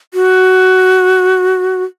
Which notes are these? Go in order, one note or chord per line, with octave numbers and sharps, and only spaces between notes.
F#4